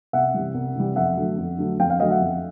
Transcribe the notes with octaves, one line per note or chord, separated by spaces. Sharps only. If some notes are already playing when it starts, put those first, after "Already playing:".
C2 E5 F#5
C3 E3 G3
C2
C3 E3 G3
F2 E5 F#5
D3 F#3 A3
F2
D3 F#3 A3
F2 F5 G5
F5 G5
D3 F#3 A3 D#5 F5
E5 F#5
F2